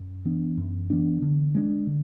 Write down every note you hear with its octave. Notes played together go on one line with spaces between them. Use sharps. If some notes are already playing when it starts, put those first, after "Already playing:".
Already playing: F#2
E3 B3 D4
F#2
E3 B3 D4
D3
G#3 B3 D4
D3